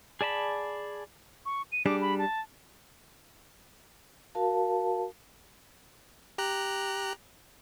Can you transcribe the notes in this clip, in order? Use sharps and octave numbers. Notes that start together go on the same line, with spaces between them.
G#4 D5 A5 B5
C#6
D#7
G3 D4 G#4 D6
B5
A5
F#4 A#4 F5 A5
G4 A#5 F#6